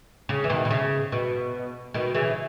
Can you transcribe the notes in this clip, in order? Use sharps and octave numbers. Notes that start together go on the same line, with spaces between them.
C#3
E3
B2 D#3
B2
C#3
B2
B2 D#3
C#3 E3